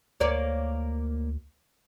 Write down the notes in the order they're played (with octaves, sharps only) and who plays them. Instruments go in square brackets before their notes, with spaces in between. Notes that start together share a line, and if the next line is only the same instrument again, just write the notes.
[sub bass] D2 [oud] A#3 C#5 D5